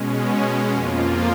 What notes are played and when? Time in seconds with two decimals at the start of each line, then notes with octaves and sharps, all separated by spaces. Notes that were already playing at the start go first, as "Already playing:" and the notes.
Already playing: B2 G#3 C#4
0.72 F2 F3 A#3 F4